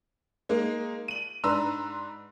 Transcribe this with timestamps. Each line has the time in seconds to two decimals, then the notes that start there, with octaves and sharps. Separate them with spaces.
0.49 G#3 A#3 D#4
1.08 D#7 F#7
1.44 G#2 D4 B4 A#5 C6 E6